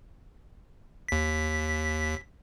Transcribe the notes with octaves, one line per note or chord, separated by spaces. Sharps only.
D#2 B6